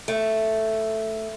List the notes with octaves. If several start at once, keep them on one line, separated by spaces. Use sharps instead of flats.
A3